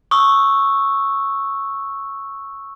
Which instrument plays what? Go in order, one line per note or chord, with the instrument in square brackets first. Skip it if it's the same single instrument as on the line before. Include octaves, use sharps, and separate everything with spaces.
[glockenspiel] C#6 D#6 E6